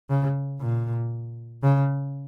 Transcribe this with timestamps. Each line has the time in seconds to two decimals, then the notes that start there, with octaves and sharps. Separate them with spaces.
0.10 C#3
0.61 A#2
1.63 C#3